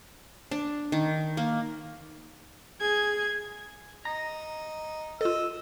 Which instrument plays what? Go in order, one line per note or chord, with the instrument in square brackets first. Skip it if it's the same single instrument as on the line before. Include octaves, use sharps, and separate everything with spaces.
[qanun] D4
D#3
A#3
[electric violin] G#4 G#6
[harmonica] D#4 [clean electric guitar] A#5
[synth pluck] F4 A4 [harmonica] D#5 [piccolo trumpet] E6